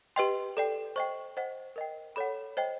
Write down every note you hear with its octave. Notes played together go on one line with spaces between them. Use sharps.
G4 B4 D#5 G5 C6
A4 D5 G5
C5 D#5 G5 C#6
C5 D#5 F#5
A#4 D#5 G5
A4 C#5 F#5 B5
C5 D#5 G5